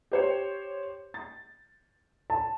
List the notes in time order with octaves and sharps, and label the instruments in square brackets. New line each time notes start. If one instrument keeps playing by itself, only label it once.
[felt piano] G4 C5 C#5
A6
[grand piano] A5